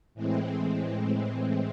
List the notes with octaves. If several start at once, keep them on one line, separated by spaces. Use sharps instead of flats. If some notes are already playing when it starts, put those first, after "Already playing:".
A2 E3 G#3 C4